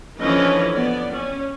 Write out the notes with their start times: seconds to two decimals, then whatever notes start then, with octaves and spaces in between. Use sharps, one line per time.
0.20 D3 E3 F3 C#4 B4 D#5
0.74 B3 D5
1.13 C#4